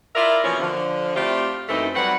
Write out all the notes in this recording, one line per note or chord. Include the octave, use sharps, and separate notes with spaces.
E4 F4 A#4 D5 E5
B2 E3 F3 A#3 C#4
D3 F3
A3 C4 E4 F4 G4 D5
F#2 E3 A3 A#3 C4 D#4
F#3 G3 C4 B4 F#5